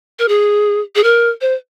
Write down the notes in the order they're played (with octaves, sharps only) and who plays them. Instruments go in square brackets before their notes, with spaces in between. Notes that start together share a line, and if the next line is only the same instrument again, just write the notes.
[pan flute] A#4
G#4
G#4
A#4
C5